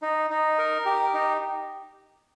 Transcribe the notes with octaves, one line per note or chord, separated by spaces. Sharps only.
D#4
D#4
A#4
G4
D#4